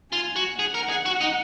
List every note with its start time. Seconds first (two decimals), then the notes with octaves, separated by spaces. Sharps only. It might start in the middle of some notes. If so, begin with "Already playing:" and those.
0.12 F4 G#5
0.36 F#4
0.59 G#4 F#5
0.74 A#4
0.90 G#4
1.06 F#4
1.21 D#4